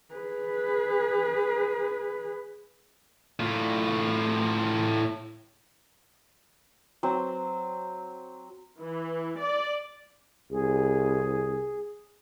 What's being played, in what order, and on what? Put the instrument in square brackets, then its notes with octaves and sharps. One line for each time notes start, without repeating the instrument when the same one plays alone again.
[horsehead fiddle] G#4 B4
[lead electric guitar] A2 F4
[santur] F#3 C4
[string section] E3
D5
[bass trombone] C2 [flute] G#4